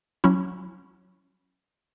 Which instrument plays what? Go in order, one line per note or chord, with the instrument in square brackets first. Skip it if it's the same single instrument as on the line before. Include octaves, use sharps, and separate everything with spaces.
[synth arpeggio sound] F#3 C#4 E4